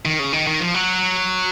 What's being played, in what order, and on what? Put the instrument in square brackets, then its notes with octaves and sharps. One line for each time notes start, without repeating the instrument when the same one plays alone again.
[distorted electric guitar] D#3
C#3
D#3
D#3
F3
F#3